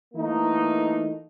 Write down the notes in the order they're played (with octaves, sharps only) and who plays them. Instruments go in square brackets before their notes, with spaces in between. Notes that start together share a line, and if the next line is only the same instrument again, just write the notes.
[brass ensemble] E3 A3 A#3 D#4